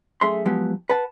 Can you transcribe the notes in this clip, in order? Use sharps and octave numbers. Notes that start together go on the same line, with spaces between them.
F#2 A3 G#4 E5 C6
F3 F#3 G#3 B3 G4
B4 F#5 A5